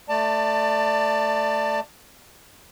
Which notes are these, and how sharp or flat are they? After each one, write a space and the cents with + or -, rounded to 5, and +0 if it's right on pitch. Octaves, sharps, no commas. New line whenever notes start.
A3 +0 D5 +10 A5 +25